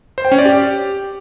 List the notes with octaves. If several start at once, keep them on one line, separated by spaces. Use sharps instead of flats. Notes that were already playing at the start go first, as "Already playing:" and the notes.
C5
G5
C#4
D5
G4